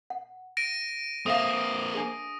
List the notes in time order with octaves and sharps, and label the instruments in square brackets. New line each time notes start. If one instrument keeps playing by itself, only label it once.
[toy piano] F#5
[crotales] A#6 D7 D#7
[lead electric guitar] A#3 C4 [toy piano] A4 E5 F5 [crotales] D#6 A#6
[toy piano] D4 G#4